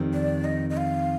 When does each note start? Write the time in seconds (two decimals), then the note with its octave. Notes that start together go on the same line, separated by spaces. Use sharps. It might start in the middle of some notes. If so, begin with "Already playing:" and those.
Already playing: F2 D#3 G3 C4
0.14 D5
0.45 D#5
0.70 D#5
0.77 F5